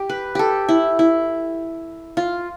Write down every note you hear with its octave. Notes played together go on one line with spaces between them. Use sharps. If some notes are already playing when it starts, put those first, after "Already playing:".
Already playing: G4
B4
G4 A4
E4
E4
F4